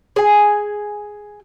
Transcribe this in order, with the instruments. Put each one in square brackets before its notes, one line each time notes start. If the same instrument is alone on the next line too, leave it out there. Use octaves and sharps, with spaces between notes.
[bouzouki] G#4 G#5